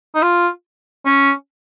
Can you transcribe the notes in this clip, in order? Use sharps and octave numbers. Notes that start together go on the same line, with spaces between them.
D#4
F4
C#4